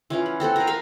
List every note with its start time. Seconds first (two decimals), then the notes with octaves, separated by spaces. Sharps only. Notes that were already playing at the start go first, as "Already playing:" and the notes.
0.10 E3 C#4 F4
0.26 F#5
0.40 C4 A4 C5 F#5
0.56 A#4 B4
0.67 A#4 F5 B5